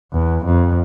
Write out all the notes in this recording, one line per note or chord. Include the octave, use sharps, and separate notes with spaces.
E2
F2